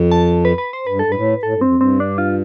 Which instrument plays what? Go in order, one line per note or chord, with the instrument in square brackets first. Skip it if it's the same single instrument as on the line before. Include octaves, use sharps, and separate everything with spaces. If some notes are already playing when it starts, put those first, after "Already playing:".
Already playing: [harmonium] F2
[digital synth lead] A5
B4
B4
C5
[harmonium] G2 [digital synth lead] B4
[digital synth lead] A4
[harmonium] G2
[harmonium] A2 [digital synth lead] B4
[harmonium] A2 [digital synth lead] A4
[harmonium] G2
[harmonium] F2 [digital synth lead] C4
[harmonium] G2
[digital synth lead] C4
D4
F4